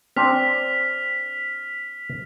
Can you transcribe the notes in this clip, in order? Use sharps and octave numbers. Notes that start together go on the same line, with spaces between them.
C4 D4 F6 B6 F7